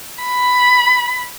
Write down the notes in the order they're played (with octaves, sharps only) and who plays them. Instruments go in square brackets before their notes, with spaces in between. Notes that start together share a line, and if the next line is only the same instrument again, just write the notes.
[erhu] B5